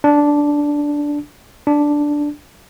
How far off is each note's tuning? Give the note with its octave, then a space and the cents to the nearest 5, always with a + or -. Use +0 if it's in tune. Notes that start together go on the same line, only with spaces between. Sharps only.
D4 -5
D4 +0